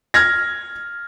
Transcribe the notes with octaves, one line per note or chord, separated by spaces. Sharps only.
F6 G#6 A#6